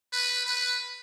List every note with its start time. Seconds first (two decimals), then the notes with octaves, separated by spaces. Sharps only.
0.13 B4
0.46 B4